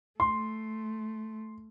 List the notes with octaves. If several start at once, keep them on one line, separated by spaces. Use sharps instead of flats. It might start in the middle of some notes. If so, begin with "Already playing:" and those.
A3 C6